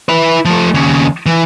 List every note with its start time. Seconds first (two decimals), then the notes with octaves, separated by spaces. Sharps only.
0.09 E4 B4
0.45 F3 A3
0.74 D#2 C#3
1.26 E3